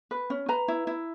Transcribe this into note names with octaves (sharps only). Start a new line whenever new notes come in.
B4
C#4
B4 A#5
E4
E4